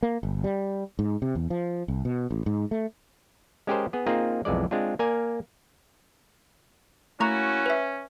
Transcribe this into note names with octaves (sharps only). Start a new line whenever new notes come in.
A#3
G1
G3
G#2
C3
E2
F3
C2
B2
A1
G#2
A3
G#3 C#4 G4 G#4 A#4 C5
B3 G#4
A#3 C4 D#4 F4 G#4
B1 F2 E3 G#3 D5
G#3 C4 D4 F4
A#3 A#4 D5 G#5
A3 A#3 C#4 E4 F#4 A#5 C#6
B4 E5